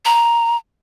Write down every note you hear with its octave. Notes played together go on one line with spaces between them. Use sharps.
A#5